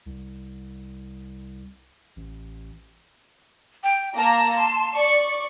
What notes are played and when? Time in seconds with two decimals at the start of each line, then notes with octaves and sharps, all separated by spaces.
0.06 C2
2.16 A1
3.84 G5
4.17 A#3 A5 A#5
4.59 C6
4.96 D5 C#6 C#7